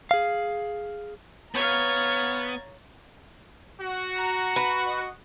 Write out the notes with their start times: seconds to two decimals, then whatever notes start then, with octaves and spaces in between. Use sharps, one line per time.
0.11 G#4 F5
1.55 B3 C#5 F5 A#5 G#6 A6
3.80 F#4
4.17 A#5
4.56 B4
4.86 D#5